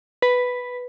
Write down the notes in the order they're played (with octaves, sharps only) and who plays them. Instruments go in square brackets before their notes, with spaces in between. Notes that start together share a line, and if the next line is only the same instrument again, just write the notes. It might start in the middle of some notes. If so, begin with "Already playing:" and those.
[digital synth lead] B4